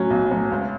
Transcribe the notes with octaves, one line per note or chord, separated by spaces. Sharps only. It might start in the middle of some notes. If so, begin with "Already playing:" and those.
Already playing: A2 F#3 C#4 F#4
B1
A2 F#3 C#4 F#4
C#2